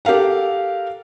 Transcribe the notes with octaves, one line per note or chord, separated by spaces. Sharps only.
G4 A4 A#4 F5 F#5